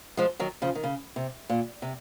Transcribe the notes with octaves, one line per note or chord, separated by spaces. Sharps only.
F3 G#3
D#3 F#3
C#3 F3
D#3
C#3
C3
A#2
C3